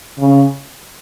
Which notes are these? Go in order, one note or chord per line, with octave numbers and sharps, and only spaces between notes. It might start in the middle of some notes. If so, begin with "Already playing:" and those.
C#3